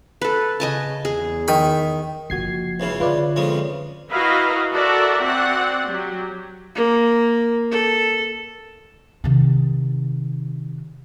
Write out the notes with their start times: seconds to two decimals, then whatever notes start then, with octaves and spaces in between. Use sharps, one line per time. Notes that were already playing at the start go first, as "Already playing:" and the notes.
0.21 A4 B4
0.60 C#3 D#5 G#5 A5
1.05 E2 G#4
1.48 D#3 B5
2.30 F#1 F3 F#4 G#6 C7
2.80 C#2 C#3 E3
3.00 D3 F4 B4 D5
3.36 F2 C#3 G#3
4.10 E4 F#4 A#4 B4 D#5 F5
4.73 F#4 A4 A#4 D5 E5 F#5
5.23 C4 F#4 D5 F#5
5.89 F#3 G4
6.75 A#3
7.71 A4
9.24 C3 D#3